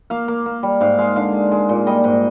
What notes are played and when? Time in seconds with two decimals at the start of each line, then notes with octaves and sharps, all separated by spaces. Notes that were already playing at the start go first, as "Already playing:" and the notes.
0.10 A#3 F5
0.28 A#3
0.46 A#3
0.63 G3
0.81 G#2 F5
0.98 G#3 F5
1.16 D3 F5
1.33 G#3
1.51 G#3
1.69 A#2
1.87 G3 D#5
2.04 G#2